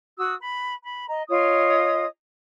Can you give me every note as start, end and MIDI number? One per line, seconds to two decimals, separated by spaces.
0.18 0.34 66
0.18 0.34 87
0.18 0.34 88
0.40 0.73 83
0.83 1.07 83
1.08 1.22 75
1.08 1.22 82
1.29 2.05 65
1.29 2.05 73
1.29 2.05 75
1.29 2.05 87